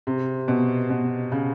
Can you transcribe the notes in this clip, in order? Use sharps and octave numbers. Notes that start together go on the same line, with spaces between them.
C3
B2
B2
C#3